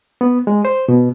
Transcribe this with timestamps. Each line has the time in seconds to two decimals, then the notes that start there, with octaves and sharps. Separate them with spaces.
0.21 B3
0.47 G#3
0.65 C5
0.88 B2